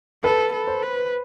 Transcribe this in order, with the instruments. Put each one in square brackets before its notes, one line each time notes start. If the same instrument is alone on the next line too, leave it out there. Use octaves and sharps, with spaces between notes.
[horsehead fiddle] A4 [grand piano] B4
[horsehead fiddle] A4
[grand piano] C5
[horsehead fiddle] B4